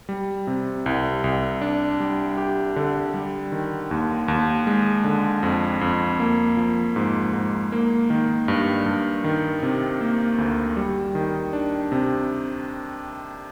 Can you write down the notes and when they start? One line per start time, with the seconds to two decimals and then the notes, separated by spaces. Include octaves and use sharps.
0.09 G3
0.47 C3
0.86 C2
1.24 C2
1.61 D4
2.00 G3
2.37 G4
2.76 D3
3.14 G3
3.52 D#3
3.91 D#2
4.28 D#2
4.67 G#3
5.04 D3
5.43 F2
5.81 F2
6.20 A#3
6.57 F3
6.96 G#2
7.33 G#2
7.72 A#3
8.10 D#3
8.48 G2
8.86 G2
9.24 D#3
9.63 C3
10.01 A#3
10.38 D2
10.77 G3
11.15 D#3
11.53 D4
11.92 C3